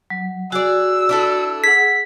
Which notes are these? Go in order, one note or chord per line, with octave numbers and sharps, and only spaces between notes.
F#3
F#4 G#4 D5 E6
D4 E4 A4
G#4 F#5 B6